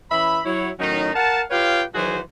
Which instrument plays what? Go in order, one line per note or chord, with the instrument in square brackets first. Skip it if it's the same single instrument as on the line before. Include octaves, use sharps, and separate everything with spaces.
[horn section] E3 C#4 E5 B5
F#3 E4 C#5
A2 D#3 F#3 C#4 D#4
A#4 F5 F#5 A5
F4 G4 B4 C#5 F5 G5
D#3 E3 F#3 F#4 G#4 C5